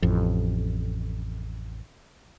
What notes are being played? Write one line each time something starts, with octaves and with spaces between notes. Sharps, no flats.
A1 F2